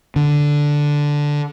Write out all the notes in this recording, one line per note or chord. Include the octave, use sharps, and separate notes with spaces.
D3